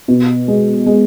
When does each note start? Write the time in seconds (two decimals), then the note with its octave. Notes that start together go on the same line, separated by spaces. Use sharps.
0.08 B2
0.48 G#3
0.86 G#3